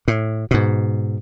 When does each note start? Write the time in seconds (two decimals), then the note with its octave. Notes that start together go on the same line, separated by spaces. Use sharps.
0.08 A2
0.51 G#2 B2